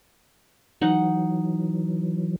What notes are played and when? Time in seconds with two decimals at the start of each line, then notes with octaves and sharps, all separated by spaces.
0.81 E3 F#3 D#4 F#5